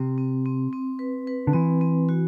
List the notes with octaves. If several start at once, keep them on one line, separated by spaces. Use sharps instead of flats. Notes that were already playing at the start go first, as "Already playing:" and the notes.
Already playing: C3 C4
C4
C4
C4
B4
B4
D3
E3 C4
C4
F#4